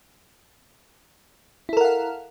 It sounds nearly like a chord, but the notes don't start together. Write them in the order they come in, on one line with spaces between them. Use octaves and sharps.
E4 A4 A#4 F#5 F5